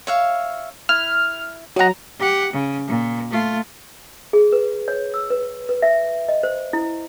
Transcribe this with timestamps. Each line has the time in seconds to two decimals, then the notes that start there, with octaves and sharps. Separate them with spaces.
0.07 C#5 E5 F5
0.89 E4 F6
1.76 F#3 F#4 D#5 A#5
2.19 G4 F#5
2.53 C#3
2.87 A#2
3.30 A3 F4
4.33 G#4
4.52 B4
4.88 C#5
5.14 E6
5.30 B4
5.69 B4
5.82 E5
6.29 D#5
6.43 C5
6.73 E4